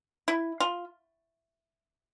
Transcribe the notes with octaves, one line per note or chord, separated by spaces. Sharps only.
E4
F4